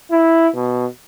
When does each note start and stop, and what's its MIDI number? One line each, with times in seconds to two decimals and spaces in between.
0.11 0.48 64
0.55 0.86 47